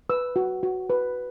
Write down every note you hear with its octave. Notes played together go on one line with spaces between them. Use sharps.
B4 E6
F#4
F#4
B4